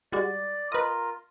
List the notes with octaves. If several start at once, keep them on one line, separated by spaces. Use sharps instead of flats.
G3 G#3 F#4 D5
F4 A#4 B4 D#5